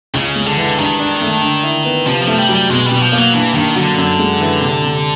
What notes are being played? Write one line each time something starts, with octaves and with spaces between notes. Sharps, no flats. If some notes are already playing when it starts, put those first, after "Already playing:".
C#2 C#3
G#3
D3
E3
G2 D#3
D4
A3
D3
E4
B3
C3 F3
F3 A3
G3
F#3
G3
B2 G#3
G3
B2
F3
A#3
F#3
G2 E3
G2 D#3
D3 F#3
F#2
G#3
E3
C3
C3